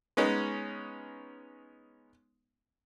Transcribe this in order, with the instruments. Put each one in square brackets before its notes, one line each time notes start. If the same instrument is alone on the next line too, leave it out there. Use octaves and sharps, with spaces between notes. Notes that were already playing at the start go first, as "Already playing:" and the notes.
[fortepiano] G#3 B3 C#4 D#4